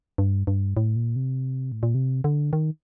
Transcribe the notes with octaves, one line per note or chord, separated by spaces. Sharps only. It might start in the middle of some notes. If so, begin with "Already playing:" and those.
G2
G2
A2
A#2
C3
A2
A#2
C3
D3
D#3